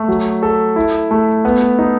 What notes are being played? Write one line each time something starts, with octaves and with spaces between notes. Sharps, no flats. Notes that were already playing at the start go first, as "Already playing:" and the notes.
Already playing: A3
F#3
A4
E4
A3
B3
D#4